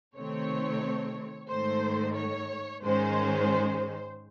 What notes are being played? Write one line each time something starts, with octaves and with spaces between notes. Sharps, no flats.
C3 D#3 A3 C4 C#5
G#2 D#3 A3 C5
C#5
G#2 D#3 G#3 C#4 C5